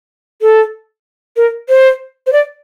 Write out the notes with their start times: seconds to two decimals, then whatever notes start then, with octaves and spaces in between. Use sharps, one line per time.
0.42 A4
1.37 A#4
1.69 C5
2.27 C5
2.33 D5